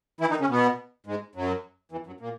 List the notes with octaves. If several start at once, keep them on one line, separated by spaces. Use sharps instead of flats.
E3 E4
D#3 D#4
C#3 C#4
B2 B3
G#2 G#3
F#2 F#3
E2 E3
F#2 F#3
A#2 A#3